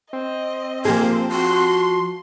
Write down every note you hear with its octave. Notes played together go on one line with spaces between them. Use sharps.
C4 D#5
F3 A#3 G4 G#4 C5
F#4 C6